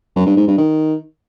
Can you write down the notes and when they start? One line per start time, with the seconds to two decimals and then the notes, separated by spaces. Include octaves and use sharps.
0.16 F#2
0.27 G2
0.37 G#2
0.48 G2
0.58 D#3